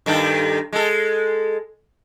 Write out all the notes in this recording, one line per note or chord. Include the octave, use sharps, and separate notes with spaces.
G2 D#3 A4
G#3 A4